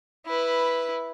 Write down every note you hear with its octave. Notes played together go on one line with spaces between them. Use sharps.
E4 B4